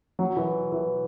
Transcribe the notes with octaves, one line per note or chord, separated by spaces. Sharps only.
F#3
E3
E3